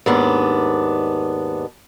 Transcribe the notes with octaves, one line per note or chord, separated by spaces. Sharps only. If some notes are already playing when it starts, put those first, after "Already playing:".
D#2 G#2 B3 D4